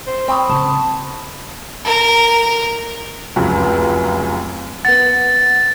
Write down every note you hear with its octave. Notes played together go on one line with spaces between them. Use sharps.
C5
C4 B5 C#6 D#6
C#3 A5
A#4 A#5
F1 C#2 F#2
B3 F#5 A6